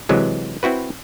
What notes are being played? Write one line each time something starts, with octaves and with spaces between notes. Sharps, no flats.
C3 E3 F#3 G#3
C4 E4 F#4 B4